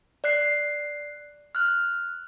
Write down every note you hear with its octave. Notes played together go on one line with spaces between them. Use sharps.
D5 F#6 C7
F6 F#6